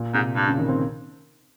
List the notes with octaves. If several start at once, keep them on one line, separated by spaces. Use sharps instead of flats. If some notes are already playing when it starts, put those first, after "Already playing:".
Already playing: A#2
G#2 C3
G2
C#3
D#3
C4